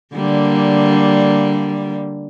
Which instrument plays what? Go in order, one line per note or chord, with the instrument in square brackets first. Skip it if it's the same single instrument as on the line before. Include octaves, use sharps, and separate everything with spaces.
[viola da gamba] D3 G3 A#3